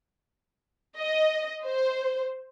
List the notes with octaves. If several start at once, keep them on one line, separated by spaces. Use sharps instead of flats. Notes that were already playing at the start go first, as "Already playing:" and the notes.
D#5
C5